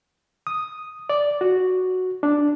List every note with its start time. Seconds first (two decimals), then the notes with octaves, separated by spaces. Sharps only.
0.47 D#6
1.10 D5
1.41 F#4
2.23 D4